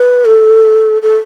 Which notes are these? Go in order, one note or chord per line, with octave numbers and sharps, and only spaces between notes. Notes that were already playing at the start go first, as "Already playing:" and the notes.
Already playing: B4
A4
A4